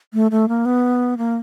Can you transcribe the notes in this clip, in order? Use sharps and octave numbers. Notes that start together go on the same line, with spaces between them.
A3
A3
A#3
B3
A#3